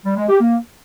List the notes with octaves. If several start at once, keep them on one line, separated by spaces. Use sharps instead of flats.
G3
G#3
G4
A#3